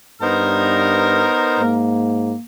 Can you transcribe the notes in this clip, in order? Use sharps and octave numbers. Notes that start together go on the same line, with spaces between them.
G2 B3 D#4 A#4 C5 A#5 F6
G#2 A#3